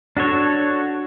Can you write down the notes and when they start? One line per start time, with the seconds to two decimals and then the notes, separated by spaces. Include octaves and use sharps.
0.17 D4 F#4 A4 C#5